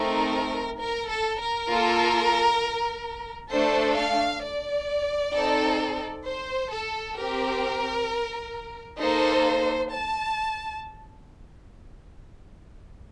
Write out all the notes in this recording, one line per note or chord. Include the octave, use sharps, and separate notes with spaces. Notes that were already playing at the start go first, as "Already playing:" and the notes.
Already playing: A3 C4 D#4 A#4
A#4
A4
A#4
A#3 F4 A4
A3 D4 A4 C5
F5
D5
C4 D#4 A4
C5
A4
C4 G4 A#4
A#3 D#4 A4 C5
A5